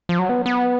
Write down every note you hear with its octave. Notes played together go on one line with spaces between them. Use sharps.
F3
F#3
B3
B3